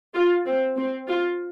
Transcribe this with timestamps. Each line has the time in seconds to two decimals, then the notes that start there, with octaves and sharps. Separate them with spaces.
0.15 F4
0.46 C4
0.77 C4
1.07 F4